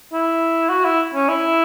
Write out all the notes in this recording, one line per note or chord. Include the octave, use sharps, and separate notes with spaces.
E4
F#4
E4
C#4
E4